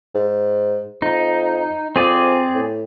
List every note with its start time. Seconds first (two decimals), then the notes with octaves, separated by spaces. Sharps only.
0.15 G#2
1.02 F2 D#4
1.96 F2 C4 G#4 D5
2.55 A2